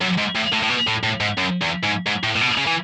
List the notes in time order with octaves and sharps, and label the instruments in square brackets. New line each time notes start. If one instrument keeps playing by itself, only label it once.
[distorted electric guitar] F#2
G#2
A2
A2
A2
B2
A2
A2
G#2
F#2
E2
G#2
G#2
A2
A2
B2
C#3
E3